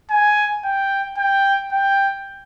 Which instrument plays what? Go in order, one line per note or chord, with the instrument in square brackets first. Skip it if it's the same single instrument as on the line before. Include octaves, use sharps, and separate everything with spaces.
[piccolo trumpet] G#5
G5
G5
G5